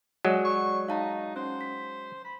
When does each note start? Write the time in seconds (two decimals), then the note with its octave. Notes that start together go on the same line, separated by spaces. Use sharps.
0.25 F#3 G#3 C#5 D5 F#5
0.45 C#6
0.88 D#4 F5 A5 A#5
1.36 C#4 C5 F#5
1.61 B6
2.25 B5